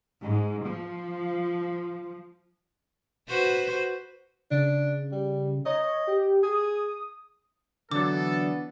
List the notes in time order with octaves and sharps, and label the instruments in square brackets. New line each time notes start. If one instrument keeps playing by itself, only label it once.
[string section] G#2
F3
[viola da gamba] F#4 B4 C5
[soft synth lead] C#3 [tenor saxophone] D4
[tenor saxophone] G3
[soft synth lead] C#5 [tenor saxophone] D#5
[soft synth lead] G4
[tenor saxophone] G#4 [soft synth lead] D#6
[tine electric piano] D3 F#3 [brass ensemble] E3 B3 D4 [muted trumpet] A4 [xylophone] D6